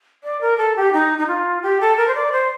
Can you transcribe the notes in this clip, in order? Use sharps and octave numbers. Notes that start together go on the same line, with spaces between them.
D5
A#4
A4
G4
D#4
D#4
F4
G4
A4
A#4
C5
D5
C5